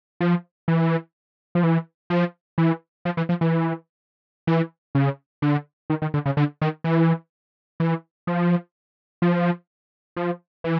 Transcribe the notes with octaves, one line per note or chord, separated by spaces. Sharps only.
F3
E3
F3
E3
F3
E3
F3
E3
F3
E3
E3
C#3
D3
D#3
D#3
D3
C#3
D3
D#3
E3
E3
F3
F3
F3
E3